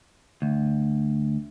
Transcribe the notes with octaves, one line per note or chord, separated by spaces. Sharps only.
D2